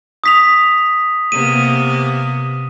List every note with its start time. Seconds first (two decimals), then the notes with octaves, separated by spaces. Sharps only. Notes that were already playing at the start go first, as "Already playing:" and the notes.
0.24 D#6 B6 F7
1.32 C3 A#3 B3 D#7